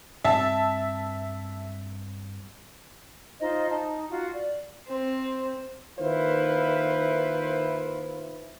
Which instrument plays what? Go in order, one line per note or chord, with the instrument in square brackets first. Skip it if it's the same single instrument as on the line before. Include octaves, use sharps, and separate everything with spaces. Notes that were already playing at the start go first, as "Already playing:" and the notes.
[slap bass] G2 C4 [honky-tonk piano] E5 A5
[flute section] D#4 F4 C5 D#5
D#4 A5
F4 F#4
D5
[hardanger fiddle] C4
[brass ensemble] D#3 A#3 E4 F4 B4 C5